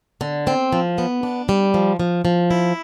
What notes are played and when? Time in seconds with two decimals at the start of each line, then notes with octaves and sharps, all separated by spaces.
0.21 D3
0.47 C4
0.73 F3
0.98 B3
1.23 D4
1.49 G3
1.74 F3
2.00 F3
2.25 F3
2.51 E4